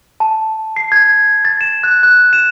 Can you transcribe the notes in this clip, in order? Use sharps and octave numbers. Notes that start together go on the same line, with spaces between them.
A5
C7
G#6
A6
E7
F#6
F#6
E7